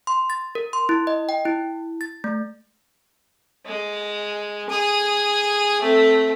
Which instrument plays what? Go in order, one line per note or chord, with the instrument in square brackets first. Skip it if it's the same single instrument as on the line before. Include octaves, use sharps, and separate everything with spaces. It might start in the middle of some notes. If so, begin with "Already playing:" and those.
[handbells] C6
A6
A#4
C6
E4
D#5
G5
E4
A6
A3
[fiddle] G#3
G#4 D#6
A3 C4